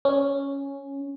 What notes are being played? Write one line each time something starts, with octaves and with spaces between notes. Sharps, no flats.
C#4